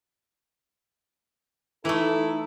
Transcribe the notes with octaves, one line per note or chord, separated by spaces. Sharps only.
E3 A3 D#4 E4 A4 A#5